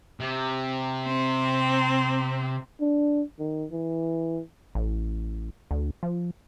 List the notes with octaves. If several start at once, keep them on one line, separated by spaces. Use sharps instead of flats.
C3
C4
D4
D#3
E3
A1
D2
F3